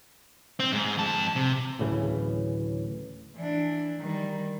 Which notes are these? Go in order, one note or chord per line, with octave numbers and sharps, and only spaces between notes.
C4
G#2
F2 A5
C3
D1 A2 C#3 E3
E3 D4
D#3 G3